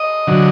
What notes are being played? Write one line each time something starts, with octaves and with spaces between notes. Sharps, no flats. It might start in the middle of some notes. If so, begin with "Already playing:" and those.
Already playing: D#5
D3 F#3